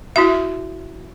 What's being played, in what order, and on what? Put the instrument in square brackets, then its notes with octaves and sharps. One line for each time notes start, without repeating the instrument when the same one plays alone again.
[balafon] E4 F#4 E5